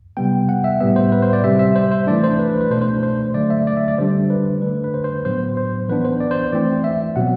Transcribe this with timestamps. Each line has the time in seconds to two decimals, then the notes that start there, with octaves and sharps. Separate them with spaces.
0.17 C3 G3 B3 G5
0.49 F#5
0.64 E5
0.80 A2 G3 B3 E5
0.96 C5
1.12 B4
1.22 C5
1.33 D5
1.44 C3 G3 C4 E5
1.59 E5
1.75 C5
1.91 C5
2.07 E3 A3 D4 D5
2.24 C5
2.39 B4
2.49 B4
2.61 B4
2.70 B2 A3 D4 C5
2.81 C5
3.03 C5
3.35 D3 F#3 A3 D5
3.50 E5
3.67 D5
3.77 E5
3.88 D5
3.98 D3 G3 D4 C5
4.30 B4
4.62 D3 A3 D4 B4
4.84 B4
4.94 C5
5.04 C5
5.25 A2 F#3 B3 C5
5.57 C5
5.89 E3 B3 D4 B4
6.05 C5
6.20 D5
6.31 C5
6.52 E3 A3 C4 D5
6.84 E5
7.16 B2 F#3 C4 F#5